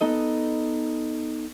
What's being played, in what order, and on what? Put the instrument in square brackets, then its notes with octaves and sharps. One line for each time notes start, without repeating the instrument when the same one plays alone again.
[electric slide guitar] B3 D#4 A4 D#5